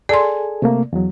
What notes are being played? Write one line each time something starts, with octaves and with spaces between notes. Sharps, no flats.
G#4 A4 D5 G#5 C6
C3 A3 A#3
E2 F#3